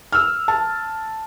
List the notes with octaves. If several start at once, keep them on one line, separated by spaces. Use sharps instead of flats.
E6 F6
A5